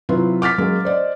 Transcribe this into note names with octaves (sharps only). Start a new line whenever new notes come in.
C3 F#3 E4 F4 B4
D6 F6 A6 B6
F#3 G#3 A#3 C#4
C5 D5 D#5